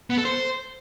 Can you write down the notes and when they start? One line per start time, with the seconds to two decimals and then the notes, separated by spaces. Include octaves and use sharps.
0.10 B3
0.18 A4
0.25 C5